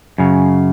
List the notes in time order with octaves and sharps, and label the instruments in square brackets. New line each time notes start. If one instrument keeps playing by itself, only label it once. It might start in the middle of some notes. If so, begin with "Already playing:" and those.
[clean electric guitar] F#2 C#3